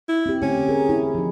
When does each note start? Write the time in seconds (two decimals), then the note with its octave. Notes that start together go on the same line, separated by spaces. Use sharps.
0.09 E4
0.26 C4 G4
0.42 D3 A3 C#4 G4
0.68 G#4 A#4
0.89 E4
1.15 F3 D#4